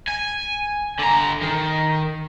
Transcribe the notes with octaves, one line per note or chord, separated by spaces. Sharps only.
G#5
D3 A#5
D#3